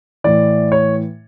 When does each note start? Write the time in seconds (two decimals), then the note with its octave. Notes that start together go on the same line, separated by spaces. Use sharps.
0.24 A2 E3 D5
0.72 C#5